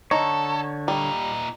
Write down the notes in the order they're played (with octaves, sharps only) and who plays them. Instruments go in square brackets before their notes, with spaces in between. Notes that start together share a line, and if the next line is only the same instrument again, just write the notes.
[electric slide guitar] D3 C#5 [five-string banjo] D#4 [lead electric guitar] A4
[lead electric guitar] A#2 D#4 [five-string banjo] G3